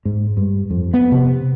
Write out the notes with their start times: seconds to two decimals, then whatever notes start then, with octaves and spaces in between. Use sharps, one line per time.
0.05 G#2
0.37 G2
0.70 F2
0.94 B3
1.12 C3